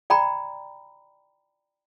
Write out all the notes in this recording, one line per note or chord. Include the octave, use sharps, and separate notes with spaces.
D5 G5 A#5 B5